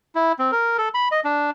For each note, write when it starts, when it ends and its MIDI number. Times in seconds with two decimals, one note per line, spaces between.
0.15 0.32 64
0.39 0.51 60
0.52 0.77 70
0.78 0.89 69
0.94 1.09 83
1.11 1.20 75
1.24 1.50 62